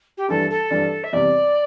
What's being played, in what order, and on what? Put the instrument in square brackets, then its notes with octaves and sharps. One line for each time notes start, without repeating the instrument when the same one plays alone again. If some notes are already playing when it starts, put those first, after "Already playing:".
[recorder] G4
[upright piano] G2 E3 G3 D4 [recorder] A4
[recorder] A4
[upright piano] G2 E3 G3 D4
[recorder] E5
[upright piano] E2 C3 G3 [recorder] D5